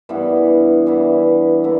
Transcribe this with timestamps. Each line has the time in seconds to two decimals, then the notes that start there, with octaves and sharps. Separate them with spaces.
0.09 G2 E3 B3 E4
0.87 G2 E3 B3 E4
1.64 D3 A#3 E4